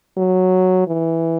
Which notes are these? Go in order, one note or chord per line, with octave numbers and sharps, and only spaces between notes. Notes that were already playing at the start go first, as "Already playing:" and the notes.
F#3
E3